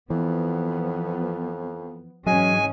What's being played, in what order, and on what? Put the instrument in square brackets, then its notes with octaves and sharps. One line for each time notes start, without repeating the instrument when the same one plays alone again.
[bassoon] F2 [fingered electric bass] E3 [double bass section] F3 B3
[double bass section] G#2 E3 C#4 [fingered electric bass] F#3 [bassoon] G#3 [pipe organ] G#5